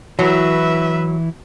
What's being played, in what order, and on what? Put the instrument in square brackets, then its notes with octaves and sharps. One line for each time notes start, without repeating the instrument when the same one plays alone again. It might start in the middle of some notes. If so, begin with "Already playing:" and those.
[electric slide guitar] E3 E4 [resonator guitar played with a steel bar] F#3 [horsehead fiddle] B4 E5